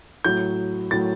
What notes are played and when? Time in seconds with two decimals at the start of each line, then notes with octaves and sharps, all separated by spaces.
0.24 A2 F#3 G6
0.91 A2 F#3 A6